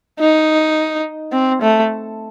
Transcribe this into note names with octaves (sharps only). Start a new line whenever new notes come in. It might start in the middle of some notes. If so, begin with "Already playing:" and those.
D#4
C4
A3